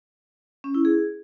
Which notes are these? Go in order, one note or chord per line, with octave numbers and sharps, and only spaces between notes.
C#4
E4
G#4